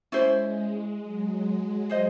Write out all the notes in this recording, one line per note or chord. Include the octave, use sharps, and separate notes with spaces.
G#3 C#4 E4 C5
F#3
G#4 C5 D#5